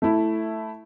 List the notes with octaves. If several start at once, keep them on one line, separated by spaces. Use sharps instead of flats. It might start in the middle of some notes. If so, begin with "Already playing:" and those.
A3 E4